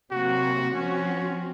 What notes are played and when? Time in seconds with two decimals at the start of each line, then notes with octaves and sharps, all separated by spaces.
0.11 C3 F#3 A#3 F#4
0.75 F3 C4 C#4 F#4